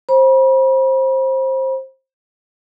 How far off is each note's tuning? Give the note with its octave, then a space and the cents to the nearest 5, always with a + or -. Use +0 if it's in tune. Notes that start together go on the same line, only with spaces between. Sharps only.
C5 +20 B5 -40